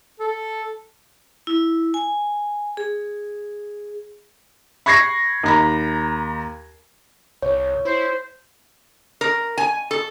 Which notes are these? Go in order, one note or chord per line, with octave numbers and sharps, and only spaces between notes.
A4
E4
G#5
G#4
B5 C#6 G#6 A#6 C7
D#2 A#5 B5
C2 C#5
E4 C5
A#4
G#5
A4